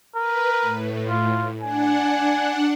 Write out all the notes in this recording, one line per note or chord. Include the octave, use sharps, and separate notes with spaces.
A#4 B4
A2
F4
D4 F#5 G#5